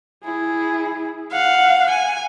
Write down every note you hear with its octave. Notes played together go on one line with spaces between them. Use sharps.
E4 G#4
F5 F#5
G#5